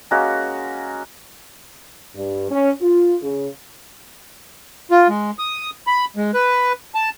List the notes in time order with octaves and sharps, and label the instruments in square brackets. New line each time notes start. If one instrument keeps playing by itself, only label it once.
[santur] G#3 A#3 C#4 F#4
[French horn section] G2
C#4
F4
C#3
[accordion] F4
G#3
D#6
B5
G#3
B4
A5